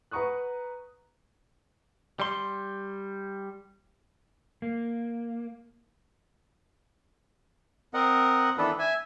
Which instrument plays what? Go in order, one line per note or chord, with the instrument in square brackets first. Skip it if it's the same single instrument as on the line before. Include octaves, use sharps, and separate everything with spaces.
[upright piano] B4 F#5 A#5 C#6 D#6 F#6
[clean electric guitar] G3 C6
[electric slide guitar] A#3
[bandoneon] C4 A#4 D#5 F#5
D#3 E3 B3 D4 A4 B4
E5 G#5